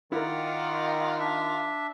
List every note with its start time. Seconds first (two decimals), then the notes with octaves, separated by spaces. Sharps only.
0.12 D#3 E4 F4 A#4 D5 F#5
1.19 D4 E5